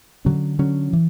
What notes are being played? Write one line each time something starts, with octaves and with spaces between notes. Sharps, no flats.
D3 F#3 C#4
D3 F#3 C#4
E3